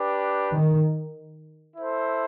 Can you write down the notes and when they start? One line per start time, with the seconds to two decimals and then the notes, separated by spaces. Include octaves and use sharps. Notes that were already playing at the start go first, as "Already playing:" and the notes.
Already playing: D4 G4 B4
0.53 D#3
1.76 E4 A4 C5